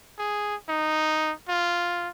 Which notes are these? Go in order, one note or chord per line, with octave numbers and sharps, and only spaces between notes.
G#4
D#4
F4